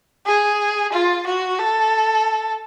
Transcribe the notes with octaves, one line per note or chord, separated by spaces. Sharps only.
G#4
F4
F#4
A4